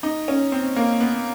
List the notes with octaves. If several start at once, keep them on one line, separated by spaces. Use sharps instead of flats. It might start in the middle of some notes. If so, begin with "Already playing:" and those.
D#4
C#4
C4
A#3
B3